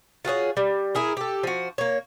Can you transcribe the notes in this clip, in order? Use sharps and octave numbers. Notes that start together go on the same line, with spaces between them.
F4 F#4 G#4 C#5
G3
E4 G#4 A#4
G4 A4
F3 F#4
A#3 C#5